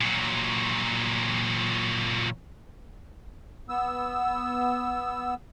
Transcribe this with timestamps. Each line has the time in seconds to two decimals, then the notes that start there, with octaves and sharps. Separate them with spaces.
0.01 A#2 F#3
3.69 B3 E6